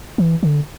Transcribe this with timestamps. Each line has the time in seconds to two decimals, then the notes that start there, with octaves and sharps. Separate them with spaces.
0.18 E3
0.43 D3